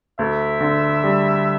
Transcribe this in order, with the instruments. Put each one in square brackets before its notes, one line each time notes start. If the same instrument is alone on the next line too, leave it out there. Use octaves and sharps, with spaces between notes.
[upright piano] D2 [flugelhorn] E5
[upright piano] D3
G3